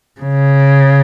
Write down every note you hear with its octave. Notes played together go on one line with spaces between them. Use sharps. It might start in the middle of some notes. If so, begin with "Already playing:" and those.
C#3